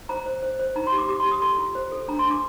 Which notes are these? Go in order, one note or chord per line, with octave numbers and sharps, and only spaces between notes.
C5 A#5
C5
C5
C5
D#4 A#5
C6
G4
D6
G4 D6
C6
G4
D#6
A4 C6
F4
C5
A4
D4 A#5
C6
D4
D6